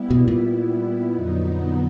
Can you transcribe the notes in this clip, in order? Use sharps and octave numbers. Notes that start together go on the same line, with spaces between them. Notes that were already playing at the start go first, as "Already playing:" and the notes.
Already playing: G3 B3 E4
B2
A#2
F2 D3 F#3 B3 D#4